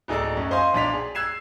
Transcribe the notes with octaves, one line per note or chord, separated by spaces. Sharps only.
D1 D#4 G#4 A4 D5 E6
F#2 C#4
C5 D#5 F5 G#5 C6
B1 D4 C6 B6 F7
G#4
E6 F#6 G#6 C7 E7